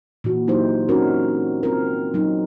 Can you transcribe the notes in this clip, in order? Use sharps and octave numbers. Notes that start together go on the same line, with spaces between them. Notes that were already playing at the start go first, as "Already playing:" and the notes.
A#2 E3 F#4
F#3 D#4 E4 G4 C5
C4 C#4 D#4 F#4 A#4
C4 F4 A#4
F#3 D#4